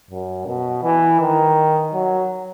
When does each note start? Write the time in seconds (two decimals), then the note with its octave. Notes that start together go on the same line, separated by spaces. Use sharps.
0.11 F#2
0.47 B2
0.83 E3
1.20 D#3
1.94 F#3